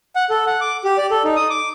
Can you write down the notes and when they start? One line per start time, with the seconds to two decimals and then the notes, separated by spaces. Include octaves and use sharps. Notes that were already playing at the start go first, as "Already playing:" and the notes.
0.16 F#5
0.30 A4
0.47 F#5
0.61 D6
0.84 G4
0.98 D5
1.11 A4
1.24 D#4
1.36 D#6
1.50 D6